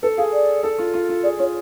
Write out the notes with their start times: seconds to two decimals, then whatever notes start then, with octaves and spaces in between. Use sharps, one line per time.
0.03 A4 B4
0.18 G#4 F5
0.33 D5
0.63 A4
0.78 F4
0.94 F4
1.09 F4
1.23 G#4 D5
1.39 F4 C#5